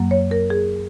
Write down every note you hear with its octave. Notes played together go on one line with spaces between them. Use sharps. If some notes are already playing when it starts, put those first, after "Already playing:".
Already playing: F#2 F#3 A#3
C#5
A#4
G#4